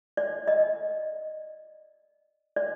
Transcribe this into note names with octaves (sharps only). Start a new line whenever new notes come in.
D5
D#5
D5